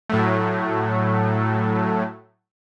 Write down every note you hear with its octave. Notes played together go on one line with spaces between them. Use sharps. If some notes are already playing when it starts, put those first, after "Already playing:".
A2 F#3 A3